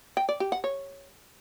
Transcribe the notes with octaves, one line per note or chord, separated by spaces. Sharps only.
G5
D5
G4
F#5
C#5